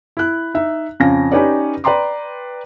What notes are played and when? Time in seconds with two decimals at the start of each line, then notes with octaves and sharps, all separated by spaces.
0.17 E4 F#6
0.54 D#4 E5
1.00 F2 C#3 C#4 F5 A#6
1.32 C#4 D#4 G4 B4 C#5 D5
1.84 B4 D5 G5 A#5 C6 D6